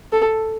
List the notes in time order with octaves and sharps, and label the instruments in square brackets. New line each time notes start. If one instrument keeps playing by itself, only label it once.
[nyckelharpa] A4